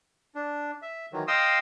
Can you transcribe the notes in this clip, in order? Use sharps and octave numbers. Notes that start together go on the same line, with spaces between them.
D4
E5
D#3 E3 F#3
D#5 F5 G5 C6 D#6 E6